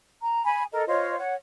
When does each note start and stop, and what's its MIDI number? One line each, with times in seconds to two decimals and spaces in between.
0.21 0.41 82
0.44 0.64 80
0.44 0.64 83
0.72 0.86 69
0.72 0.86 70
0.72 0.86 75
0.87 1.16 65
0.87 1.16 72
0.87 1.16 73
0.87 1.16 75
1.18 1.34 73
1.18 1.34 78